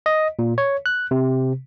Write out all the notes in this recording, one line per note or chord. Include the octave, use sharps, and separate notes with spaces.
D#5
A#2
C#5
F#6
C3